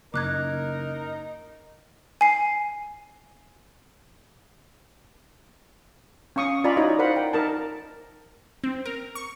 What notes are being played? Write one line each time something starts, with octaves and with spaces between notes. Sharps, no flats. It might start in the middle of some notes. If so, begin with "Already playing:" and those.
F#1 D#4 A#4 D6 F#6 G#6
G#5 C7
C#4 F5 C#6 D#6
F4 D5 D#5 G#5 A#5 B5
D#4 E4 F#4 C#5 D#5
A#4 C5 D5 F5 F#5 B5
G5
D#4 A#4 A5
C4
A#4
C#6